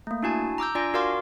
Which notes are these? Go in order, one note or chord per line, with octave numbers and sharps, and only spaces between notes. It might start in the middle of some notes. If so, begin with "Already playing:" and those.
A3 A#3
D4 E4 F#4 G#5 A5
A#5 D6 E6 G6
D4 F4 D5 G#5 A#6 D7
F#4 A#4 D5 F5 C6 D6